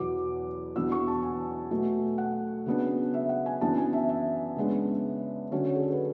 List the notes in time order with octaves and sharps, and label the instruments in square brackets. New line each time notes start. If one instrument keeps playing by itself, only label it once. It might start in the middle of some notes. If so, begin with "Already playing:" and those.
Already playing: [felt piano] E2 B2 F#3 D6
E2 B2 F#3 B3 D4 E6
C#6
A5
G#5
B2 F#3 A3
F#5
C#3 F#3 B3 D4
E5
F#5
G#5
F#2 E3 B3 D4 A5
G#5
E5
E5
C#3 G#3 B3 D4
D3 F#3 C#4
G#4
A4
B4